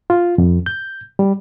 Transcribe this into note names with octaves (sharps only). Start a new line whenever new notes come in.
F4
F2
G6
G3